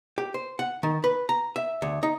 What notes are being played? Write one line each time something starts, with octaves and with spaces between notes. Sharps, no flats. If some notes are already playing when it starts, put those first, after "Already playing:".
G4
C5
F#5
D#3
B4
A#5
E5
D2
D#4